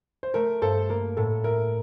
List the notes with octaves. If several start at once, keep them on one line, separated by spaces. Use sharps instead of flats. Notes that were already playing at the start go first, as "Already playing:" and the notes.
C5
A3 A#4
G2 A4 C5
A#3 A#4
A2 A4
E4 A#4